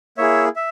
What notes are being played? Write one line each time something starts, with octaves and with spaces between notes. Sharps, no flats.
A#3 E4 G#4 C#5 E5
E5